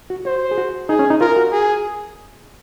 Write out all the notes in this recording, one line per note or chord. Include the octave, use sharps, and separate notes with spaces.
F#4
F#4 C5
G#4
F#4
D#4 G#4
C#4
D#4
F4 A#4
F#4
G#4